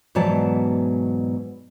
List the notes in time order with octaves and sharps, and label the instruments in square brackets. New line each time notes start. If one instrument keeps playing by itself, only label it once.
[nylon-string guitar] G#2 B2 E3 F#3 D5 A5